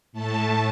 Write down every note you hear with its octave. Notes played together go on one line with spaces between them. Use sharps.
A2 A3 A5